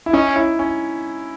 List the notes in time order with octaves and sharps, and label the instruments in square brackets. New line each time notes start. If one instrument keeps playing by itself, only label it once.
[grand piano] E4
[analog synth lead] C#4 [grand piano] D#4
[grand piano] E4
C#4